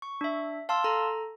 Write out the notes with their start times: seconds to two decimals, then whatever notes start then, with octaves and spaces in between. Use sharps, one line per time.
0.02 C#6
0.21 D4 E5
0.69 F5 A5 C6 E6
0.84 A4 A#5